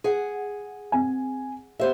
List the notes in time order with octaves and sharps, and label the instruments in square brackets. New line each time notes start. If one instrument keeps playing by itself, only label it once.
[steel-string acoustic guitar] G#4 F#5
[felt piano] C4 G#5
[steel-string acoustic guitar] B3 C5 E5 [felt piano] G4